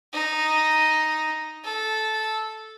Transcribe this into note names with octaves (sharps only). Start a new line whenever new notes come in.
D#4
A4